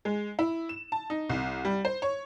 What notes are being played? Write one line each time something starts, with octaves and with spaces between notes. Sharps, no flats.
G#3
E4
E7
A5
D#4
C2
G3
C5
C#5